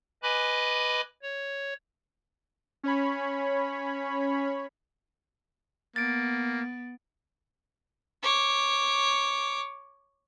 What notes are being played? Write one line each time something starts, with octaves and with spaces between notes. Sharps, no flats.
B4 D#5 G#5 B5 D6 F#6
C#5
C#4 C#5 B5
A#3 B3 A6 D7
C#5 D6